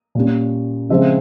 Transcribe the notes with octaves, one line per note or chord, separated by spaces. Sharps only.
A#2 G3 C#4
C#3 F3 G#3 C4 E5